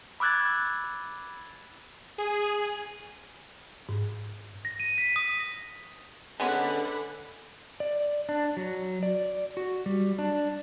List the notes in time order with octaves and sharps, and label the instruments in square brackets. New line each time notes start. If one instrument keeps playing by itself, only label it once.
[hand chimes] B5 D6 E6 F#6 G#6 A6
[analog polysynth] G#4
[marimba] G#2
[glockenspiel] A#6
D#7
B6
D#6
[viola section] D3 F#5 B5 [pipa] G#3 B3 C#4
[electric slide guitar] D5
D4
F#3
D5
F#4
G3
D4